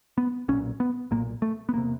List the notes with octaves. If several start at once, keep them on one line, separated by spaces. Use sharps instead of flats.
B3
B1 A#2 C#4
B3
B1 A#2 A#3
A3
B3
E1 C3 A#3